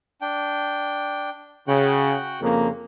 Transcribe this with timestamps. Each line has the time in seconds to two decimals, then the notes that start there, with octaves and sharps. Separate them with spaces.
0.21 D4 G5
1.68 C#3 F#4 F#5 G5
2.41 F2 C#3 A#3